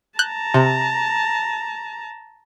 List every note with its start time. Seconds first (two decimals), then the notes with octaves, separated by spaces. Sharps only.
0.19 A5 A#5 F#6 G6
0.54 C3